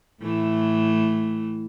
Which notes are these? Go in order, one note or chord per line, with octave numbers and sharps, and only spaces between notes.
A2 E3 A3